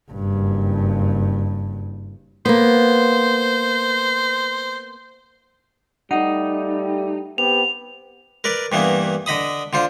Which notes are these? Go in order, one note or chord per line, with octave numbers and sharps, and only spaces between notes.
F#1 G2
A#3 B3 C5
G3 A3 D#4 G4 F#5
B3 C4 G4 F7
A#4 B4 D5
G2 E3 A#3 B3
D3 D#5 B5 D#6
D3 F4 C5